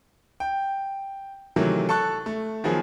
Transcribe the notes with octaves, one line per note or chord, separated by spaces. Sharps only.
G5
C3 D#3 E3 F#3 A3
A4 A5 C#6 F#6
A3
D#3 F3 F#3 B3 G#4